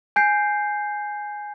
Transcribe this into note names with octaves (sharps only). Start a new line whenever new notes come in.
G#5 G6 C7